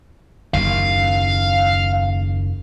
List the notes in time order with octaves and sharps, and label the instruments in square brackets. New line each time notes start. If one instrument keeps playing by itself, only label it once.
[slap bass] F#1 D#2 [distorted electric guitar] F5